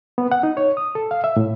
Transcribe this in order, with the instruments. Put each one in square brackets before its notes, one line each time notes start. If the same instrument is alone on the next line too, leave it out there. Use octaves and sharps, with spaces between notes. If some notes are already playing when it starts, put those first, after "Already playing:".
[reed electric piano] B3
F#5
D#4
C#5
D#6
A4
F5
E5
A2